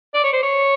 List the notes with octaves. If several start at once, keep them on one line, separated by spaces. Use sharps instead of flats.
D5
C#5
C5
C#5